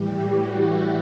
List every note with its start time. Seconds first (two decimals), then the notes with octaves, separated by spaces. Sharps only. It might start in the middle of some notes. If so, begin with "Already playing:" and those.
Already playing: A2 E3 G3 G4
0.11 F#4
0.51 E4